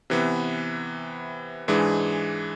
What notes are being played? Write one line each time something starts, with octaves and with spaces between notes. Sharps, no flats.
C3 E3 B3
G#2 E3 G#3 D4 G#4